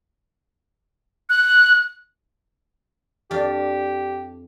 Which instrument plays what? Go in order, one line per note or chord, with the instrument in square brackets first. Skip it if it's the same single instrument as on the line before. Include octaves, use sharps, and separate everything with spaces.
[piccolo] F#6
[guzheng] F2 D4 F4 [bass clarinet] G4